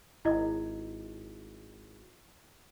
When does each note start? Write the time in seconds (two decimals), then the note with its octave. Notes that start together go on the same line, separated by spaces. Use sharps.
0.25 G#1 E4 D#5